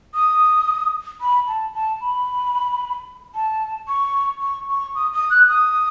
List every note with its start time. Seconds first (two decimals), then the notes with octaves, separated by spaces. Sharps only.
0.14 D#6
1.21 B5
1.47 A5
1.74 A5
2.01 B5
3.34 A5
3.88 C#6
4.41 C#6
4.69 C#6
4.95 D#6
5.13 D#6
5.30 F#6
5.48 D#6